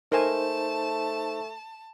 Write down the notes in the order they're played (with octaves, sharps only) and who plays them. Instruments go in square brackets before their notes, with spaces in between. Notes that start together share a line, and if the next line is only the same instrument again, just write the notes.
[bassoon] A3 [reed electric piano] D#4 C5 [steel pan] A#4 G#5 [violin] A5